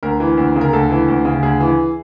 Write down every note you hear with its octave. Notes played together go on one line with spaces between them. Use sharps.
D2 A#4
E3
D2
C#3
A#4
D2 A4
E3
D2
C#3
D2 G#4
E3